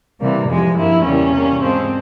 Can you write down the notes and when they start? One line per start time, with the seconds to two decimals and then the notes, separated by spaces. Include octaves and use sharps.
0.20 C3 E3 G3 A#3
0.48 F2 C3 F3 G#3
0.77 G2 F3 A#3 E4
1.05 E2 C#3 G3 A#3 C#4
1.33 C3 G3 A#3
1.61 G#2 F3 G#3 C4